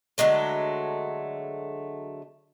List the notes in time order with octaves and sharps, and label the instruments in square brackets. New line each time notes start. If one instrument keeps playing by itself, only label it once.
[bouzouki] D3 F#3 G#3 A3